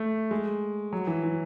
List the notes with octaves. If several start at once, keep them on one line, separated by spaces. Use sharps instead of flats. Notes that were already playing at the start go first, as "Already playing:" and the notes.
Already playing: A3
G#3
F#3
E3
E3